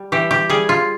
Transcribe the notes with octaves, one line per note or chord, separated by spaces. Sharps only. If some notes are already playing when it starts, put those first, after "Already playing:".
Already playing: G3
E3 G4
G4
G3 G#4
F4